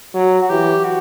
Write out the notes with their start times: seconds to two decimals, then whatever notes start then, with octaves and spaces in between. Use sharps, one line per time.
0.14 F#3 F#4
0.42 F#4
0.49 E3 G4
0.84 F#4